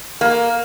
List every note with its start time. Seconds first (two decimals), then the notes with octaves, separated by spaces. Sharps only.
0.21 A#3